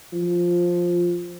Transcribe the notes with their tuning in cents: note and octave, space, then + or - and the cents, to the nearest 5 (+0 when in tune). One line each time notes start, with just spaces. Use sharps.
F3 +5